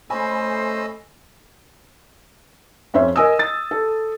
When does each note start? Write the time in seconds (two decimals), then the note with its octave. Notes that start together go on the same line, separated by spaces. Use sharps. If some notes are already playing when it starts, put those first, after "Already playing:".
0.10 A3 C#4 C5 D#5 G#5 B5 E6
2.94 F2 C#4 C5 E5
3.16 A#4 D#5 G#5 D#6 E6
3.39 A6
3.71 A4